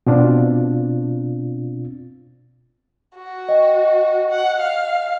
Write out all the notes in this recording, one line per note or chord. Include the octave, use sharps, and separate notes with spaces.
B2 C4 D4 F4
F#4
D#5 G5
F#5
F5